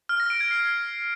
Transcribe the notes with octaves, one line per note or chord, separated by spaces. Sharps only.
F6
A#6
D7
G#6
C7